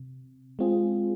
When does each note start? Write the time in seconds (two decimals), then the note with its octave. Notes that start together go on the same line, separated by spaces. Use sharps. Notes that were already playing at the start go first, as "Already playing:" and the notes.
Already playing: C3
0.59 G#3 C4 F4 G#4